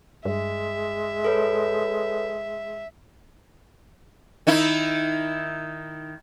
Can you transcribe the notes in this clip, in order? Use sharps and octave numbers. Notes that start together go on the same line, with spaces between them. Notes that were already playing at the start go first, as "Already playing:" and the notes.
G2 G#3 E5
A4 B4 C#5
D#3 D#4 E4